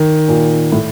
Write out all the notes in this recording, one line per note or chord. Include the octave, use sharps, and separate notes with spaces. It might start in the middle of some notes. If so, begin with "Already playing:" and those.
Already playing: D#3
A#2
A2